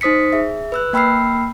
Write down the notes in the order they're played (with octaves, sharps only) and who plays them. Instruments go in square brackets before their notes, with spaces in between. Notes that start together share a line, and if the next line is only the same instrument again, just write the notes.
[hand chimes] D#4 C5 D#6 B6 C#7
G#4 E5
B4 E6 F#6
A#3 G5 B5 E6 F6 C7